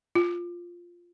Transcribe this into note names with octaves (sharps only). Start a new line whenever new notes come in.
F4